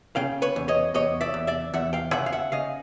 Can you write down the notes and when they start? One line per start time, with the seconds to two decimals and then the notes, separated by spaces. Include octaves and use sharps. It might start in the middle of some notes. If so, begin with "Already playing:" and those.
0.16 C#3 F5 G5
0.42 B4 C#5
0.56 E2
0.68 C#5 D#5
0.94 E2 C#5 D#5
1.21 D5 E5
1.34 E2
1.47 D5 E5
1.74 E2 E5 F#5
1.93 F5 G5
2.12 C#3 E5 F#5
2.26 F5
2.32 E5 F#5
2.52 C#3 D#5 F5